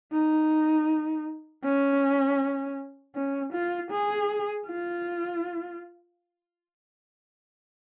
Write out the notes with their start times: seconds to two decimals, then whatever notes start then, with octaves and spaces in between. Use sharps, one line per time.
0.12 D#4
1.64 C#4
3.16 C#4
3.53 F4
3.91 G#4
4.67 F4